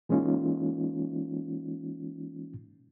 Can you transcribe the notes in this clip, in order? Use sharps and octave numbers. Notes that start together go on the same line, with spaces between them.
E3 G#3 A#3 C#4 D#4 F4